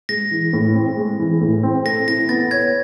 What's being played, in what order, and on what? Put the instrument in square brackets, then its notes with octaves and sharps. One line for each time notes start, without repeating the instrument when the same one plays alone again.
[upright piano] G#3 [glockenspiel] A#6
[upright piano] E3
A2
C4
G#3
E3
A2
C4
[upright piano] A4 [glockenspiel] A#6
[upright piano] E4 [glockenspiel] A#6
[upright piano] B3 [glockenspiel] A6
[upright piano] C#5 [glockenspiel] G#6